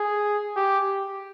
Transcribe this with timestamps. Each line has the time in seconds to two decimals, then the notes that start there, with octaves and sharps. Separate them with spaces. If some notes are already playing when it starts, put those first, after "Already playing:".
Already playing: G#4
0.56 G4